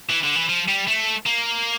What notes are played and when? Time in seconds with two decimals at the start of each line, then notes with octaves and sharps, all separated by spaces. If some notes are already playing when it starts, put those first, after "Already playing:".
0.10 E3
0.23 D3
0.35 E3
0.49 F3
0.68 G3
0.87 A3
1.26 A#3